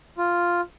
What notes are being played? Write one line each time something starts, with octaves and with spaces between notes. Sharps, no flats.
F4